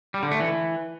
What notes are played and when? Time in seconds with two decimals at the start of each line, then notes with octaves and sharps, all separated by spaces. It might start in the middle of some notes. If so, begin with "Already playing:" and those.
0.14 G3
0.23 D3
0.31 A3
0.40 E3